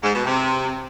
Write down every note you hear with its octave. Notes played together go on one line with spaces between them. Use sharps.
G#2
B2
C3